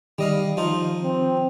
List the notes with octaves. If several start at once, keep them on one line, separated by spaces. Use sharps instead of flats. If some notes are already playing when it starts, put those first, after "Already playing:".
D#3 G3 D#5 F5
F3 D#4 F4
C4